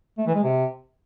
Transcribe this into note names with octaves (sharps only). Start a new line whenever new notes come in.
A3
E3
G#3
C3